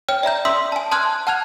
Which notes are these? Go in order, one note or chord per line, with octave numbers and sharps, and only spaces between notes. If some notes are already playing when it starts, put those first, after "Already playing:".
C#5 G5 F6
D5 E5 A#5 G6
E5 C6 D#6 E6 B6
G#5 A5
A5 C6 D#6 F6 F#6 G#6
F#5 A5 F6 F#6 G#6 F7